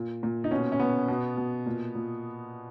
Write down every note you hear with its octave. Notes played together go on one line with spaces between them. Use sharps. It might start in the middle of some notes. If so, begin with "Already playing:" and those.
Already playing: A#2
A#2
D#4
B2 C#4
C#4
B2 B3
B2
B2
A#2
A#2